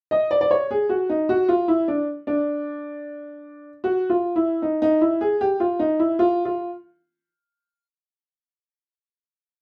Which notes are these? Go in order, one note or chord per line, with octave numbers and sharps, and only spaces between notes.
D#5
D5
D5
C#5
G#4
F#4
D#4
F#4
F4
E4
D4
D4
F#4
F4
E4
D#4
D#4
E4
G#4
G4
F4
D#4
E4
F4
F4